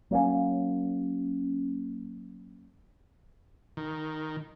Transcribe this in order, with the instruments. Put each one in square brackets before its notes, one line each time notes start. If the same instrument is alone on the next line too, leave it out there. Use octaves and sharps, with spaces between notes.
[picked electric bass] F#3 A#3 C#4
[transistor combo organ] D#3